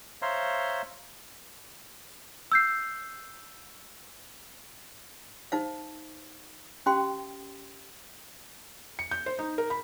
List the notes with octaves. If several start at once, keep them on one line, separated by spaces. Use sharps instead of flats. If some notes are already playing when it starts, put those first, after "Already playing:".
C5 C#5 E5 F5 A#5 C6
E6 G6 C7
D#4 C5 F5
C#4 G4 F5 G5 C6
C#7
G6
C5
D#4
A#4
B5